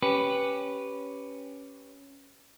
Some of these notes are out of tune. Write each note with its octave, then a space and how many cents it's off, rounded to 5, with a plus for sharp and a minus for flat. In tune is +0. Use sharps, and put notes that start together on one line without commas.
C#4 +0 G4 +0 B4 +0